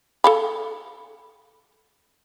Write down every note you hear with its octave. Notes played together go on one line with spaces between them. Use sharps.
A4 F5 B5